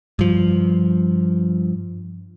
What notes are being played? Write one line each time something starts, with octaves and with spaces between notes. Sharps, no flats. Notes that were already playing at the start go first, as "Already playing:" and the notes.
G2 F3